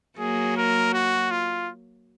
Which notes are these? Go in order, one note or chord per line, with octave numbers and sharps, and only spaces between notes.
F#3 A#3 G#4
A#4
F#4
F4